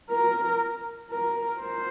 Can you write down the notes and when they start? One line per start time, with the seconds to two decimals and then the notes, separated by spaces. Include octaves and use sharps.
0.10 A#4
1.11 A#4
1.61 C5